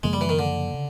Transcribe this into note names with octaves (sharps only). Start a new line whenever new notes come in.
F#2 C#3 F3 G#3 A#3
G3
E3
D#3
D3
C#3